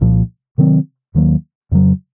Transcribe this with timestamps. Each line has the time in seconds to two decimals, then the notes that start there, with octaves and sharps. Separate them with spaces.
0.01 C2 A#2 F3
0.58 C3 D#3 F#3 C4
1.15 D#2 D#3 F#3 A#3
1.72 F2 C#3 F#3